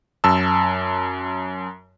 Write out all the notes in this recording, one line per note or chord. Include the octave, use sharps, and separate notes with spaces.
F#2 A5 E6